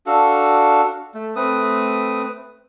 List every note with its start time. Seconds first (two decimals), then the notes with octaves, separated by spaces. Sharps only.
0.06 D4 F#4 A4 F5
1.14 A3
1.36 A3 C4 B4 D#6